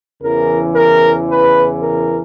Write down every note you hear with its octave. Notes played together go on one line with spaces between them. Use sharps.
E2 C#3 E3 A#4
A#4
B4
A#4